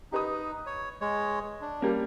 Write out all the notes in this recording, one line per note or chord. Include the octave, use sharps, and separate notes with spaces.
D#4 G4 B4 D#6
C#5
G#3 C#5
D4
G3 A#3 C#4